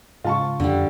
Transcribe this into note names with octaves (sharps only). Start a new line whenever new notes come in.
G#2 C#3 F4 A5 C#6
F2 D3 G3